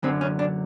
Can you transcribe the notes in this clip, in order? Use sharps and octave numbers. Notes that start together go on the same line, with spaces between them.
F#2 D3 F#3 C4
C#4
D4